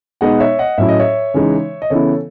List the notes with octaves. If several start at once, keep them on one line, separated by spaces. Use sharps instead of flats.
B2 G#3 B3 D#4 D#5 F#5
C#5 E5
D#5 F#5
A2 F#3 C#4 E4 E5
D#5
C#5 E5
C#3 E3 G#3 D#4
D#5
C#3 E3 B3 E4 A4 C#5